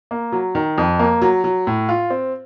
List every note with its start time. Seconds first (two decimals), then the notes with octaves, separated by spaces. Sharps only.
0.11 A#3
0.32 F#3
0.55 D#3
0.78 F2
0.99 A#3
1.22 F#3
1.44 F#3
1.67 A2
1.89 F4
2.10 C4